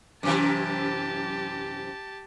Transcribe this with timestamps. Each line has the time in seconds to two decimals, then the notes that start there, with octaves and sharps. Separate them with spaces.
0.23 F#2 C3 E3 G4 A5